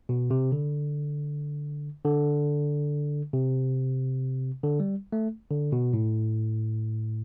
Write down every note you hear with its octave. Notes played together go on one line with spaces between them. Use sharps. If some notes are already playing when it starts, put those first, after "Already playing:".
B2
C3
D3
D3
C3
D3
G3
A3
D3
B2
A2